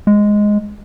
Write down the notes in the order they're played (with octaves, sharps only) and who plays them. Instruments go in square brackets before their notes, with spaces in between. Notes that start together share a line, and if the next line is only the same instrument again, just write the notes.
[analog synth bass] G#3